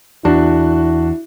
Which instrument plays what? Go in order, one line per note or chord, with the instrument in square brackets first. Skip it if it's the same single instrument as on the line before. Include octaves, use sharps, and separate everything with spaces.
[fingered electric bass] E2 [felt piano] D4 F#4 [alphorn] E4